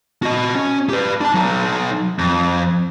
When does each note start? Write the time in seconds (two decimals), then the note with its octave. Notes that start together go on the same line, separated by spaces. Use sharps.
0.23 F#4 D#5
0.55 C#4
0.89 G4 B4
1.21 D4 A5
1.34 F#3 D#4
2.19 F2